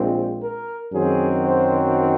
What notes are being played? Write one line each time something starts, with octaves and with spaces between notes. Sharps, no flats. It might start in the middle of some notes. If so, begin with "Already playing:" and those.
Already playing: A#1 A#2 G#3 C4
A#4
F#2 D#3 F#3 C4 G#4
C5